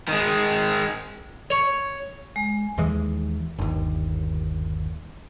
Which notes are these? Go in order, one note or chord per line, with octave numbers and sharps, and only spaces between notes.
D#3 G#3
C#5
G#3
D#2 E3 G#3
G1 D#2